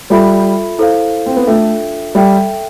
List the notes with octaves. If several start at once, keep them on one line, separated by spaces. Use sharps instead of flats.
G3 F4 A4 E5 B5
E4 A4 C5 F5
C4
B3
A3 D4 F4 A4 E5 G5
G3 A4 E5 G5